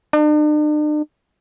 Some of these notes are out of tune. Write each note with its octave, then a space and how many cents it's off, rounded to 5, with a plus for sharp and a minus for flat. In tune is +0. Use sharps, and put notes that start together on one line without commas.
D4 +45